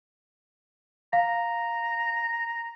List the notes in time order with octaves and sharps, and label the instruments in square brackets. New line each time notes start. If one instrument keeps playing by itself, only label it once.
[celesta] F5 [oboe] A#5